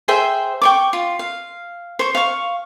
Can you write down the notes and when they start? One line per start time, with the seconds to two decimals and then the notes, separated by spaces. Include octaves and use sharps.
0.08 G#4 C5 E5 G5
0.62 G5 C#6 D6
0.93 F4
1.19 F5
1.99 C5 C#6
2.15 F5 C#6